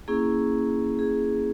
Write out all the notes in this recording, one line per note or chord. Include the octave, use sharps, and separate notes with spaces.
A#3 C#4 E4 G#4
G#4